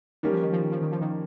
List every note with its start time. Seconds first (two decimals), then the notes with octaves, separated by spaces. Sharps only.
0.23 D#3 G3 A#3 C#4 G4 A#4
0.33 F3
0.42 D#3
0.53 F3
0.62 D#3
0.72 F3
0.82 D#3
0.92 F3
1.01 D#3